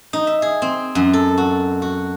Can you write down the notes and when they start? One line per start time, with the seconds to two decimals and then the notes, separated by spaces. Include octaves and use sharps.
0.13 D#4
0.27 E5
0.42 G#4
0.62 C4
0.95 F#2
1.13 A4
1.38 F#4
1.82 F#4